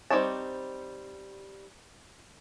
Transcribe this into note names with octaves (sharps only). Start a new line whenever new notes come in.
G3 C4 D#4 C#5 A5